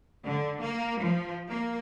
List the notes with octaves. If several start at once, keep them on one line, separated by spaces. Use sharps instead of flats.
D3
A#3
F3
A#3